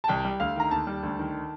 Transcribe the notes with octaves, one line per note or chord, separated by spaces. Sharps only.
A5
C2 G5
G3
D2 F5
D#3 A#5
D#2 A5
G3
D2
D#3